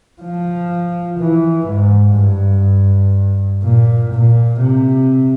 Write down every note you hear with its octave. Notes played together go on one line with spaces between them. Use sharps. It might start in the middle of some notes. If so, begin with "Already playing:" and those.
F3
E3
G#2
G2
A#2
A#2
C3